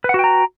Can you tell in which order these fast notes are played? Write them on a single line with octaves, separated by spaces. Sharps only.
B4 F#5 F#4 G5 A#5